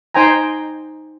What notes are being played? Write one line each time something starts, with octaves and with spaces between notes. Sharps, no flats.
D#4 C5 G5 G#5 A#5